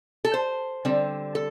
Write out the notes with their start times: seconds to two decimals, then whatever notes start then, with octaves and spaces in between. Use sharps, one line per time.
0.25 A4
0.34 C5
0.85 D3 G3 C4
1.35 A4